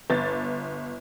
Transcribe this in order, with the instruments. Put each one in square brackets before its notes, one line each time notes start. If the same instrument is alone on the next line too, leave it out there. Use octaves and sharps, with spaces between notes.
[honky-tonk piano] G1 A6